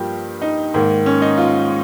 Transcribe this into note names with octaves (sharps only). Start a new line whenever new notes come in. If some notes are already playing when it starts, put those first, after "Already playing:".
Already playing: G2 F3 A#3 G4
D#4
G#2 D#3 A#3
C#4
D#4
F4